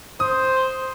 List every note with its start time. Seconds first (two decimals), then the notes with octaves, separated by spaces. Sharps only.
0.20 C5 D#6